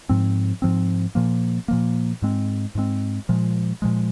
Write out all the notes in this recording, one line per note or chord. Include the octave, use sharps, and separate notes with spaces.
G#2 F3 C4
G#2 F3 C4
A#2 F3 A#3
A#2 F3 A#3
G#2 G#3 C4
G#2 G#3 C4
A#2 F3 G#3
A#2 F3 G#3